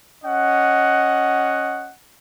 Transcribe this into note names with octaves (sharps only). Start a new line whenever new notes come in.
C#4 D#5 F#5